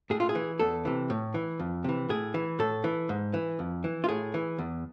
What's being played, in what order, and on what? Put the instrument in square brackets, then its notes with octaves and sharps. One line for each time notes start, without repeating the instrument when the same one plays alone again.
[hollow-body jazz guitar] A2 G#4
F4
G#4
E3
E2 A4
C3 E3
A2
E3
F2
C3 E3
A2 G#4
E3
A2 A4
E3
G#2
E3
F2
E3
F4
A2 G#4
E3
E2